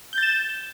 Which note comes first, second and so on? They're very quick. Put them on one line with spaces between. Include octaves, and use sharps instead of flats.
G6 A6 E7